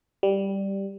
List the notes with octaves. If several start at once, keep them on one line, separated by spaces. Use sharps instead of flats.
G3